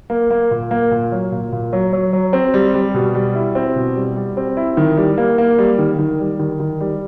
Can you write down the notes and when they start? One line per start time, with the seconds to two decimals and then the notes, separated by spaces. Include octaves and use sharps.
0.10 A#3
0.30 A#3
0.51 A#2
0.71 A#3
0.91 A#2
1.12 F#3
1.32 A#2
1.52 A#2
1.73 F#3
1.93 F#3
2.13 F#3
2.33 C4
2.54 G3
2.74 G3
2.94 B2
3.15 G3
3.35 E4
3.55 C4
3.76 B2
3.96 G3
4.16 G3
4.37 C4
4.57 E4
4.77 D#3
4.97 G3
5.18 A#3
5.38 A#3
5.58 G3
5.79 D#3
5.99 D#3
6.20 G3
6.39 D#3
6.60 D#3
6.81 G3